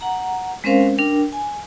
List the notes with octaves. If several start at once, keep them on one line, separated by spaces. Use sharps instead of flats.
F#5 A#5
G#3 C4 C#4 A#4 C5 F5
D4 A#4 G5
G#5